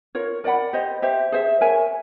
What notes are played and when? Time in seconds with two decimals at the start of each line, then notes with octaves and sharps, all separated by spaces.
0.15 F4 A#4 C#5
0.44 A#4 D5 F#5 B5
0.73 G4 C5 D#5
1.02 G4 C5 E5
1.32 G#4 C5 E5
1.61 A#4 C#5 E5 G#5